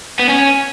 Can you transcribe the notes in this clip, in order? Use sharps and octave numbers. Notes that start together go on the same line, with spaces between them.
B3
C#4